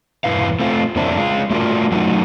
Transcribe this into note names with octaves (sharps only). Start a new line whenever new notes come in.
E2 G2 A#2 E4 B4 F5
A3 C4 F4
F2 A#3 C4 D4 E4
G#3 F4
A3 D4 F4 F#4 A#4
F#3 A3 D#4 E4 F#4